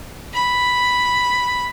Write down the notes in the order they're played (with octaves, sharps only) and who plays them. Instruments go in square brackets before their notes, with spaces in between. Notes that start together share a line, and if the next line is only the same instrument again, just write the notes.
[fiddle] B5